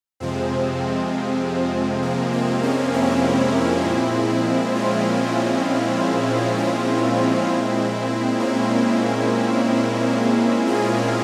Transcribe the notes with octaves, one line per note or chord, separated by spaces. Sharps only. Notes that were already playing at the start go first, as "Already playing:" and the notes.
F2 C3 F3 G#3 C4
A#3
C4
A#3 C#4
C4 E4
A#2 F3 G#3
C#4 F4
C4 E4
A#2 G#3
A#3 C#4
C4
F4 G#4